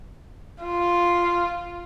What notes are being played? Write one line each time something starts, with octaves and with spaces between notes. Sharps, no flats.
F4